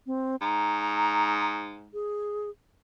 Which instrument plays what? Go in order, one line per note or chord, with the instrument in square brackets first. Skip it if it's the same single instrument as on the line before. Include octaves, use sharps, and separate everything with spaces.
[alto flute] C4
[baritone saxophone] G#2 [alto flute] A#5
[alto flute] G#4